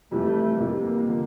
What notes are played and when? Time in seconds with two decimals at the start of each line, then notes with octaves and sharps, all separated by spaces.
0.11 F2 C3 E3 G3 A3
0.59 F2 C3 E3 G3 A#3
1.06 D3 F3